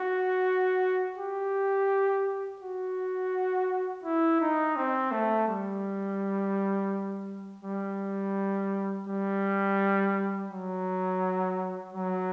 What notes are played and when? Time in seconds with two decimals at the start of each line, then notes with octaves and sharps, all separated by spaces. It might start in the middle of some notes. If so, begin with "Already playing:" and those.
Already playing: F#4
1.18 G4
2.61 F#4
4.04 E4
4.41 D#4
4.76 C4
5.11 A3
5.48 G3
7.63 G3
9.07 G3
10.50 F#3
11.92 F#3